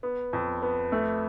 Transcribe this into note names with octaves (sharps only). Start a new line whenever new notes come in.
B3
F2
B3
A3